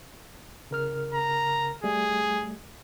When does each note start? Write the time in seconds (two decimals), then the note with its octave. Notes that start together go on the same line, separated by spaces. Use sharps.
0.71 C#3 A#4 F6
1.14 A#5
1.84 G3 A3 G#4